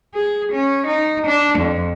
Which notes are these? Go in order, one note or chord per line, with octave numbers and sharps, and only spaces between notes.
G#4
C#4
D#4
D4
F2